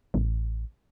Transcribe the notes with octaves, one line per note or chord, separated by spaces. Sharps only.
A1